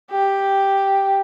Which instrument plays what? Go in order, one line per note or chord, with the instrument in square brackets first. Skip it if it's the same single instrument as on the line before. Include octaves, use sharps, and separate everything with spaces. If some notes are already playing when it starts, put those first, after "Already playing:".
[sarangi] G4